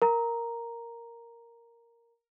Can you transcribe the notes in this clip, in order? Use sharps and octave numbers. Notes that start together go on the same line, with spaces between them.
A#4 A#5